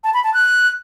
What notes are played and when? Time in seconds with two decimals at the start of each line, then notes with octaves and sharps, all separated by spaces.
0.04 A5
0.14 B5
0.24 A5
0.34 F#6